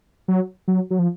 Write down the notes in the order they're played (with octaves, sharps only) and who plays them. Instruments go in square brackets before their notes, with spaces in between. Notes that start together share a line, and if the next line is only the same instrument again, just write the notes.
[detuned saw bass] F#3
F#3
F#3
F3